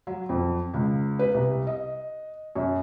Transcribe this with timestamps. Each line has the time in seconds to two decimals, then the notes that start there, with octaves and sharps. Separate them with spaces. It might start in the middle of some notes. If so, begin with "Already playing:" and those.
0.07 F#3
0.29 F2
0.74 C#2
1.19 B4
1.34 C2
1.67 D#5
2.55 F#2